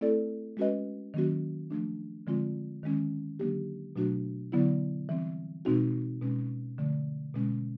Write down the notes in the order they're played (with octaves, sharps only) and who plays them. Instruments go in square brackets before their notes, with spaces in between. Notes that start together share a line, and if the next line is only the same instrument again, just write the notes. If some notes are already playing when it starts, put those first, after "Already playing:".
[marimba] A3 C4 E4 A4 D5
G#3 C#4 F#4 B4 D#5
D#3 F#3 A#3 C#4 F#4
F3 A3 D4
D3 F3 G#3 C4 F4
D#3 G#3 C#4
D3 F#3 A#3 D4 G4
B2 F#3 A3 D4 F#4
D3 F#3 B3 E4
E3 G3 C4
B2 G#3 C4 D#4 F#4
B2 G#3 C#4
D3 F3 A3
B2 G#3 C#4